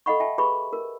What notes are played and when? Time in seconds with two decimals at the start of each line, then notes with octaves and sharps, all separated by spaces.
0.06 A4 D#5 F5 F#5 B5 C#6
0.20 E5 G5 A5
0.38 G4 G#4 B4 B5 C#6
0.73 A#4